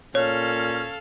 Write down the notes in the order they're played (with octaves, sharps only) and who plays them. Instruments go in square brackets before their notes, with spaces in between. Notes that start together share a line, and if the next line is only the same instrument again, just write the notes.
[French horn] A#2 [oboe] C#4 [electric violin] A4 F5 [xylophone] C#5